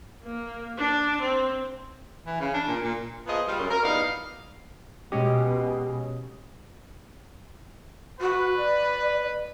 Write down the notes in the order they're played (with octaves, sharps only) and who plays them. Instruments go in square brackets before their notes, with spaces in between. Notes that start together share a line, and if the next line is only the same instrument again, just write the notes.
[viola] A#3
D4
C4
[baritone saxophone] E3
C#3
D4
A#2
A#2
[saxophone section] A#2 F3 B3 F4 G#4 D#5
G3 G#3 F4
F#2
A#4
E2 A#2 G3 B3 D#4 F5
[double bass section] B2 [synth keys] G#3 C#4 D#5 [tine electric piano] G4
[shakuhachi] F#4 [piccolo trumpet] B4
[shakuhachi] D5